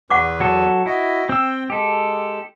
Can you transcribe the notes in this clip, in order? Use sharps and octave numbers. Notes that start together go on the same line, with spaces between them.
E2 B4 F#5 C#6 D6
F#3 F#4 A4
E4 F#4 D#5
C4 G5 E6
G#3 G4 A4